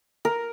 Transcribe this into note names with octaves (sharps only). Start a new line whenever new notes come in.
A#4